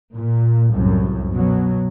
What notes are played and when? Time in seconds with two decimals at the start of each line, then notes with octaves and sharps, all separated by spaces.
0.14 A#2
0.71 C2 F#2 A2
1.29 B2 F#3